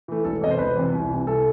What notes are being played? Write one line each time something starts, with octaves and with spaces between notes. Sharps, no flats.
E3 A3
E1 A4
E2 C3 D#5
C5
E1 B4
E2 C3
C2
C3 E3
C2 A4